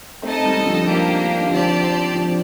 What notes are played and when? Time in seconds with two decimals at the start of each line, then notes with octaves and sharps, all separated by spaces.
0.22 A3 C4 D#4 A4 D#5 A5
0.43 D#3 G3
0.65 D3 F3
0.86 A#3 D4 G4
1.39 D#3
1.50 D3 F3 C4 G4 D5 A5
2.14 D3 F3